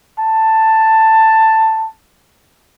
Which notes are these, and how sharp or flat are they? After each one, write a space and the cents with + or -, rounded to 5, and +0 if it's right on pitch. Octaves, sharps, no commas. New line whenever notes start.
A5 +10